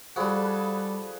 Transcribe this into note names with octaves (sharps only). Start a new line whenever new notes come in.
F3 G3 F#4 G#4 A4 B4